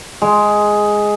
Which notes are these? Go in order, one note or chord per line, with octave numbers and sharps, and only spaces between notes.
G#3